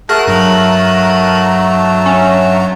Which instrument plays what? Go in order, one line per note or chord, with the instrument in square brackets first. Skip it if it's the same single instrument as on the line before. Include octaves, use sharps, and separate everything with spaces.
[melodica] A3 F#4 A5 [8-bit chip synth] G#4 [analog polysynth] A#4 F#6 D#7
[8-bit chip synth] G2 F#3 A#5
[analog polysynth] C#4